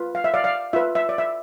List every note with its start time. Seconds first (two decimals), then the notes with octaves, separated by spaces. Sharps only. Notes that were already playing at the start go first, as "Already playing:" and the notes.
Already playing: F4 B4
0.15 F5
0.24 E5
0.34 D5 F5
0.44 D5 F5
0.73 F4 B4 E5
0.95 E5
1.09 D5
1.18 E5